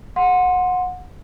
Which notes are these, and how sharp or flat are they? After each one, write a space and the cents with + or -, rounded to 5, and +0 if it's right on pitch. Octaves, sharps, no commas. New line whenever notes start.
F#5 -25 C6 +0